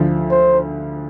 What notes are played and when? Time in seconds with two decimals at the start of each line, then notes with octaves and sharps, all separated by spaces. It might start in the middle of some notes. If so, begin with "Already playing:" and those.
Already playing: D2 D3 F3
0.31 C5